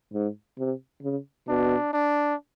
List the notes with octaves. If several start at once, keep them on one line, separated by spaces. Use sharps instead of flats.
G#2
C3
C#3
B2 D4
D4